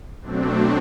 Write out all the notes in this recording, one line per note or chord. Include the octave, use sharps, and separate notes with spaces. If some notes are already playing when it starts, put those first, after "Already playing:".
B2 F#3 A3 C4 D4